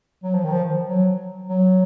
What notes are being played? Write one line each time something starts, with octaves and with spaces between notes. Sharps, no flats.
F#3
F3
D#3
F3
F#3
F#3